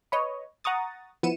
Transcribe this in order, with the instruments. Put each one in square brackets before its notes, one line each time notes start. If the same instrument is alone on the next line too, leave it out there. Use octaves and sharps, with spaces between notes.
[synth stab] B4 C#5 D#5
F#5 A#5 C#6 D#6 A6
F3 B3 E4 C#7 D#7 E7